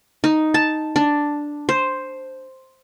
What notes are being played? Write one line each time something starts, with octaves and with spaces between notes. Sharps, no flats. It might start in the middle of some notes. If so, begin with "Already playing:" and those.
D#4
A5
D4
C5